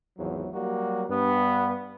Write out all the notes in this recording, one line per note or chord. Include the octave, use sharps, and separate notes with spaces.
G#1 E2 F3 F#3
F#3 G3 A#3 F#4
G2 B3